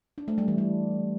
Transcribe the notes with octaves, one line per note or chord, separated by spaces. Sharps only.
D4
A3
G3
E3
G3